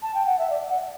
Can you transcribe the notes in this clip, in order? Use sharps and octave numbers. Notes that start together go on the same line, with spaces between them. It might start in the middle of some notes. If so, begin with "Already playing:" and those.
A5
G5
F#5
E5
D5
F#5